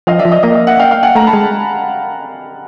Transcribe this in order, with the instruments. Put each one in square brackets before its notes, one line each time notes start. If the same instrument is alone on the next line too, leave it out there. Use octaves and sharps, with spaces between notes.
[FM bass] F3 [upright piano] D#5 F5
[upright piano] D5 E5
[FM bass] F3
[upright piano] D#5
[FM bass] A#3 [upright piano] D#5
[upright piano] D#5
E5 F#5
F5 G5
F5 G5
F#5 G#5
[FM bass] A3 [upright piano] G#5 A#5
[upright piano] A5 B5
[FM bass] G#3